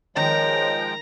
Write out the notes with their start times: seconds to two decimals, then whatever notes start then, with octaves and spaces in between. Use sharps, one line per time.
0.16 D#3 F3 G#3 C#5 G5 A#5